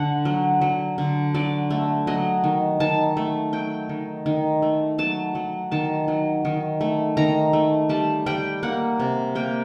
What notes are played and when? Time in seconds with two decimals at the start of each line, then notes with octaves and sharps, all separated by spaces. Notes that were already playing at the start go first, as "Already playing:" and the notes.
Already playing: D3 F#5
0.25 F#3
0.61 F#3
0.98 D3
1.34 F#3 D5
1.70 A3
2.07 F#3 D#5
2.44 D#3
2.80 D#3 A5
3.17 A3
3.53 F#3 G5
3.89 D#3
4.26 D#3
4.62 A3
4.98 F#3 A5
5.35 F#3
5.71 D#3 A5
6.08 F#3
6.45 D#3
6.81 A3
7.17 D#3 A#5
7.53 A3
7.89 G3 A5
8.26 G3 G5
8.63 A#3 F#5
9.00 C3
9.35 A#3 G5